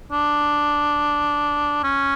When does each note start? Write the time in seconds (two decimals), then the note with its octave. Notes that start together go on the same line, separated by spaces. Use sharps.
0.12 D4
1.83 C#4